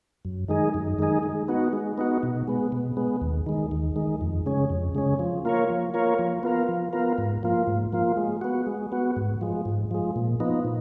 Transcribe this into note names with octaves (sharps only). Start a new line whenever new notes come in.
F#2
D#3 G#3 D#4 G#4
F#2
D#3 G#3 D#4 G#4
G#3
B3 D#4 F#4
G#3
B3 D#4 F#4
B2
G#3 B3
B2
G#3 B3
D#2
D#3 G#3
D#2
D#3 G#3
F2
C#3 G#3 C#4
F2
C#3 G#3 C#4
F3
A#3 F4 A#4 C#5
F3
A#3 F4 A#4 C#5
F3
B3 F4 A#4
F3
B3 F4 A#4
G#2
F3 A#3 F4
G#2
F3 A#3 F4
G#3
B3 F#4
G#3
B3 F#4
G#2
F3 G#3
G#2
F3 G#3
A#2
F3 B3 D#4
A#2